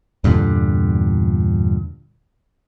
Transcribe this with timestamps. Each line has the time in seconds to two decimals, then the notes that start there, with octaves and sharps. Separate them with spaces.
0.24 E2 G2 A#2 D3